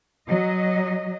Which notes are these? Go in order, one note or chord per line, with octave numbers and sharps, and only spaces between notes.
F#3 D#5